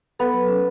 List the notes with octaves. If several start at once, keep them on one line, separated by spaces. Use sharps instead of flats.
B3 A4
F#3
C#4